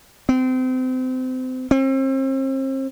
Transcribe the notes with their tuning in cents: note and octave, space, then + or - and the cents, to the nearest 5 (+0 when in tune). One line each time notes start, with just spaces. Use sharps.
C4 -30
C4 +40